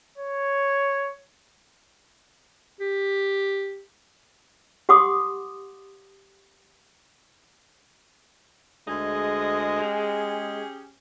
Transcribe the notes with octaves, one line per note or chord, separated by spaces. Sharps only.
C#5
G4
G4 F#5 C6 D6 D#6
D2 G#3 G#4 D#5
C#4 G4 G#4